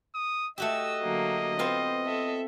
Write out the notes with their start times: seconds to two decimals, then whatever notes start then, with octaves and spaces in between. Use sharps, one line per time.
0.15 D#6
0.58 A3 F#4 G4 D#5 E6
1.01 D3 F#3 A#3
1.59 B3 C4 F4 C5
2.04 A4 E5